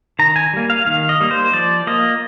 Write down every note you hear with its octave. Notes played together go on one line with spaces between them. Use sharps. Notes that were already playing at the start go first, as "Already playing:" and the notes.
D#3 A#5
G#5
G3 A#3
F5
D#3 F5
D#5
G3 A#3
C5
F3 D5
A#3 D#5